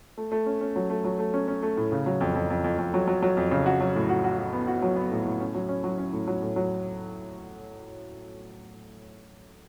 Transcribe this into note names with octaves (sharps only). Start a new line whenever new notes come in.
A3
A3
C#4
C#4
F#3
A3
F#3
A3
C#4
C#4
A3
A2
C#3
F#3
F2
F2
F2
F2
F2
F#3
F#3
F#3
F2
C#3
F#4
F#3
A2
F#4
F#4
F#4
B3
F#4
F#3
B3
A2
A2
C#4
F#3
C#4
F#3
C#4
A2
F#3
A2
F#3